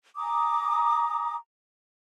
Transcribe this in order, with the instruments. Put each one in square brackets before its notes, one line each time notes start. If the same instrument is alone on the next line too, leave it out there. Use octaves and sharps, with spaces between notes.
[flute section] G#5 A#5 D6 D#6